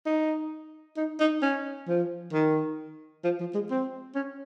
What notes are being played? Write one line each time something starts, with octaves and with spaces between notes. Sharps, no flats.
D#4
D#4
D#4
C#4
F3
D#3
F3
F3
G#3
C4
C#4